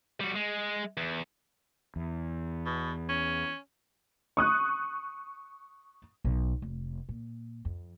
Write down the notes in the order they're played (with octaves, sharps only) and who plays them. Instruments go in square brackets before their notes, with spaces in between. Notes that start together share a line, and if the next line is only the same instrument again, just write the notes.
[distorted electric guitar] G3 F#4
G#3
E2
[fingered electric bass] E2
[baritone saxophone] B2
C#4
[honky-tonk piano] C#6 D#6 F#6
[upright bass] B1
F1
A#2
F2